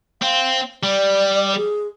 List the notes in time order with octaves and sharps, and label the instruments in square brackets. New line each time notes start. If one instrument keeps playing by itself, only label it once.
[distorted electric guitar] C4 [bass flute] F5
[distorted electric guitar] G3 [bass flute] D5
[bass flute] G#4